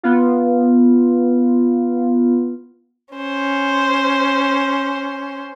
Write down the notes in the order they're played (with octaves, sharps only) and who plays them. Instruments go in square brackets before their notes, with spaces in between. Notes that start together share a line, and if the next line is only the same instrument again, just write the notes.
[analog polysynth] B3 F4
[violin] C#4 C5